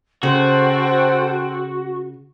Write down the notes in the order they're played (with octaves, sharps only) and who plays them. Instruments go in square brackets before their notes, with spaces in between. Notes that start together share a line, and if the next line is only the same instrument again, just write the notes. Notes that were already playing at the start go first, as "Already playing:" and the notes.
[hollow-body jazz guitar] C#3 [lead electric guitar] F#4 [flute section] A4 C5 G5